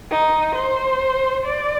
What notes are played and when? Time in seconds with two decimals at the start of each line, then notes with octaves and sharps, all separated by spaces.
0.11 D#4
0.55 C5
1.45 D5